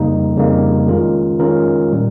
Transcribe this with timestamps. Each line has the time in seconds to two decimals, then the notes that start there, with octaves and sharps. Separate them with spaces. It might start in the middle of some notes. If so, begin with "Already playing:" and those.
Already playing: F2 C#3 G3 A#3 D#4
0.36 F2 C#3 G3 A#3 D#4
0.88 D#3 G#3 C#4 F4 A#4
1.40 D#3 G#3 C#4 F4 A#4
1.93 A#2 G3